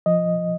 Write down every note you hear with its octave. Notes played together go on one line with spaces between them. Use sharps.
F3 D#5